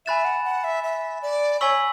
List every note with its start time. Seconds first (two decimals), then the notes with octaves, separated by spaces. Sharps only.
0.06 E5 G#5 B5 F#6 A6 E7
0.25 F#5
0.45 F#5
0.64 E5
0.84 E5
1.22 D5
1.61 C#5 G#5 C#6 E6 B6 F#7